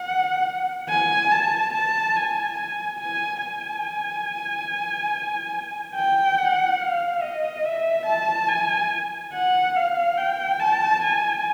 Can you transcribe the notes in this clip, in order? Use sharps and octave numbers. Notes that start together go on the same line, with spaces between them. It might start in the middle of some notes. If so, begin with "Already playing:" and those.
Already playing: F#5
G#5
A5
A5
G#5
G#5
G#5
G#5
G5
F#5
F5
D#5
E5
A5
G#5
F#5
F5
G5
A5
G#5